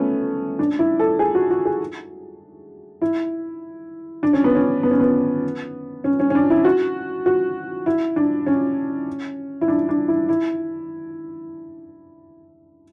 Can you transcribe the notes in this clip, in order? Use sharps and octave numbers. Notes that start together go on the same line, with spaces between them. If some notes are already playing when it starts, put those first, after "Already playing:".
Already playing: A3 B3 C#4
D4
E4
A4
G#4
F#4
F#4
G#4
E4
D4
C#4
B3
C#4
B3
C#4
B3
C#4
C#4
C#4
D4
E4
F#4
F#4
E4
D4
C#4
E4
D4
D4
E4
E4